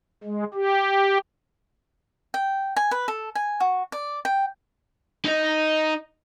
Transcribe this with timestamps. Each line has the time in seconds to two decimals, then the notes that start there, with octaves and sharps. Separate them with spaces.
0.24 G#3
0.54 G4
2.34 G5
2.76 G#5
2.91 B4
3.08 A4
3.35 G#5
3.60 F#4
3.92 D5
4.25 G5
5.25 D#4 D#5